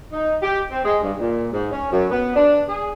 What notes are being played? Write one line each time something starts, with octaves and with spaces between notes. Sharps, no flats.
D#4
G4
C4
G#3
G2
A#2
G#2
C#4
F#2
B3
D4
G#4